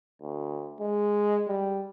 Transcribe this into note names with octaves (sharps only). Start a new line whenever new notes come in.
D2
G#3
G3